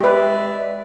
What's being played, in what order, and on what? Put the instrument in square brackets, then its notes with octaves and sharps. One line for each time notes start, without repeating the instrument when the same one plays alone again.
[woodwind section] G#3 D5 E5 [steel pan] G4 B4